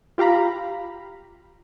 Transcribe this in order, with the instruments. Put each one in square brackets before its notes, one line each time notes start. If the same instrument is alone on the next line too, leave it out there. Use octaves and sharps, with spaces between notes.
[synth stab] F4 G4 F5 A#5 B5